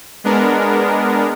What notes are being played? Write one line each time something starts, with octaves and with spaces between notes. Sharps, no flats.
G#3 B3 D4 A#4